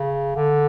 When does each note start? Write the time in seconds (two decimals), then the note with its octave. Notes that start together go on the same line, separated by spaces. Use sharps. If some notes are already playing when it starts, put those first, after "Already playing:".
Already playing: C#3
0.36 D3